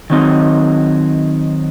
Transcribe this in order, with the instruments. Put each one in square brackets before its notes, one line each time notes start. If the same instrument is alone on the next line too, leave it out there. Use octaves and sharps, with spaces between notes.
[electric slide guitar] D#3 F#3 C4 D#4